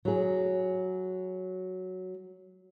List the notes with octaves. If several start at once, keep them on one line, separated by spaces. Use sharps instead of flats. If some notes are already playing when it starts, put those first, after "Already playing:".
F#3 G#4